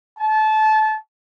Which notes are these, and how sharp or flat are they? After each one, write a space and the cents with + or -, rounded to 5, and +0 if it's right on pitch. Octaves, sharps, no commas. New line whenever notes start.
A5 -25